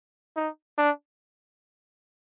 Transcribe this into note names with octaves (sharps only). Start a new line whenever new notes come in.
D#4
D4